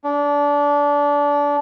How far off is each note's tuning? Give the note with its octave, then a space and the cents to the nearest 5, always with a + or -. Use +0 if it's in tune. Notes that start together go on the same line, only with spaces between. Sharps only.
D4 -25